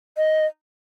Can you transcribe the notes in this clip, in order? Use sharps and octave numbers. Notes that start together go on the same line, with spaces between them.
D#5